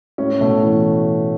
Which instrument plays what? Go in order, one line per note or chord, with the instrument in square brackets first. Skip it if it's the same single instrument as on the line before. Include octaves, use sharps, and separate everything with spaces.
[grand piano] A2 [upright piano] C#4
[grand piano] B2 [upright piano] A3
[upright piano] E3